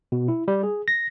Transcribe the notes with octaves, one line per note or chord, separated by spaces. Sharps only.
B2
E4
G3
G#4
A#6